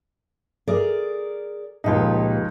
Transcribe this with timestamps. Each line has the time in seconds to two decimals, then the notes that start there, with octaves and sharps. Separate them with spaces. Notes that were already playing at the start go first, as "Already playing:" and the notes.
0.67 G#4 A#4 D5
1.84 C#2 A#2 F3 D#4 G4 B4